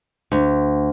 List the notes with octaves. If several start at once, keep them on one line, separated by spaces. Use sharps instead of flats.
D2